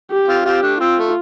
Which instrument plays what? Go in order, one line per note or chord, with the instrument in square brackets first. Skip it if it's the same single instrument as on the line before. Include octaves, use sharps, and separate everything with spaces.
[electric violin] G4
[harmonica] C4 F4
[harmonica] C4 F4 [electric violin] G4
[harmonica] A3 D4
[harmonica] C4 [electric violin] F4
[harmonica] A3